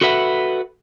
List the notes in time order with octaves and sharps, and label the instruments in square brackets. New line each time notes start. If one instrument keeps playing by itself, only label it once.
[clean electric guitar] F#4 A4 B4 E5 F#5